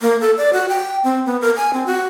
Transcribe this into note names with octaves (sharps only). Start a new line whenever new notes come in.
A#3
A4
D5
F#4
G5
C4
B3
A#4
G#5
C4
F#4